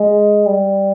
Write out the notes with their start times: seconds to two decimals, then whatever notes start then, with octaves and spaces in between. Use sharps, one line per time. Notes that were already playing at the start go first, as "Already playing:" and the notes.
Already playing: G#3
0.46 G3